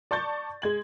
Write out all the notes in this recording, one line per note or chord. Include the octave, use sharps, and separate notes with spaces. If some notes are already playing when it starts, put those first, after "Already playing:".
D5 A5 C#6 G6 A6
G#3 G#6 F#7